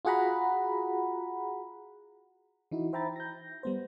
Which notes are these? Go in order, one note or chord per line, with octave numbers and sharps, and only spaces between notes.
F4 F#4 G#4 F#5 A#5 B5
E3 D#4 E4 F#4
C5 E5 G5 A#5 B5 A6
G6 A#6
G3 B3 C5